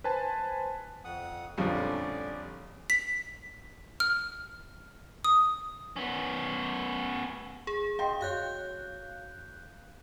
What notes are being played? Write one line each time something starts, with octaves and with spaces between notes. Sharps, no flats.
B4 C5 G#5 A5
F2 F#5 D#6
A#1 F2 A2 D3 F3 G3 C#4 D5
B6
F6
D#6
B3 C#4
G#4
D#5 F5 G5 C6
F#4 C#5 F5 F#6 G6